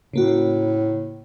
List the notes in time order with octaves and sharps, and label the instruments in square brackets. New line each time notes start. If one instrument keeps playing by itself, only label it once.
[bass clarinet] A2 [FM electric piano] C#3 A#3 F#4